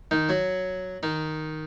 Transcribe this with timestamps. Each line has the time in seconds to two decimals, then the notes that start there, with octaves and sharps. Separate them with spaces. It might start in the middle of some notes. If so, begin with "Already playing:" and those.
0.11 D#3 D#4
0.29 F#3 F#4
1.03 D#3 D#4